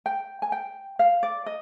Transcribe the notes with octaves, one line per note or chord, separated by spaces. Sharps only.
G5
G#5
G5
F5
D5
D#5